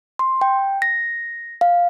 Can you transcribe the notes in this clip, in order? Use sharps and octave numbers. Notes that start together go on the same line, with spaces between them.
C6
G5
A#6
F5